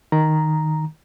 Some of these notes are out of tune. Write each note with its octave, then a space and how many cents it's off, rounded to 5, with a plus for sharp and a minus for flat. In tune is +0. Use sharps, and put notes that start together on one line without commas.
D#3 +0 A#5 +0